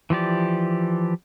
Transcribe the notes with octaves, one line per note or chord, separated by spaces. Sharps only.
E3 F3 G4 D5